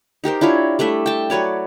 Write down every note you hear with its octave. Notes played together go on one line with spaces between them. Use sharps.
D#4 G4 A#4 C5
D4 E4 F4 C#5
G3 A3 D4 E5
G5 A5
F#3 B4 C#5 D5